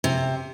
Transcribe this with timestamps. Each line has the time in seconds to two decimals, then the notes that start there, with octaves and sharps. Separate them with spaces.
0.04 C3